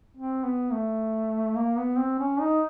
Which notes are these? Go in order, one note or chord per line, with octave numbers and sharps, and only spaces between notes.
C4
B3
A3
A#3
B3
C4
C#4
D#4